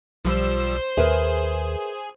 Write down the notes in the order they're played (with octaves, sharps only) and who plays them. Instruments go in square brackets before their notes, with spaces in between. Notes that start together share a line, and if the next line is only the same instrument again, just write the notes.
[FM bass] B1 [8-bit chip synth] F3 G3 E6 [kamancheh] C5
[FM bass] D#2 [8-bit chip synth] G#4 [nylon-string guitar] A#4 B4 E5